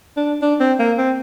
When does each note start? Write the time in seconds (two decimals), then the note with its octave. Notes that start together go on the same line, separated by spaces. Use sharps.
0.17 D4
0.42 D4
0.60 C4
0.79 A#3
0.98 C4